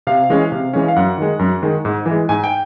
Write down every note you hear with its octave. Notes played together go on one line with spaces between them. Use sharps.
C3 F5
E3 G#3 C#4
C3
E3 G#3 C#4
F5
F#2 F#5
D#3 G#3
F#2
D#3 G#3
G#2
E3
G#3
G#2 G#5
G5